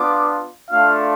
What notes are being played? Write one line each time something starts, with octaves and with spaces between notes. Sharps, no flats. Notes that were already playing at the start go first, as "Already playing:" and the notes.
Already playing: B3 D4 F4 D6
A3 D4 F4 F5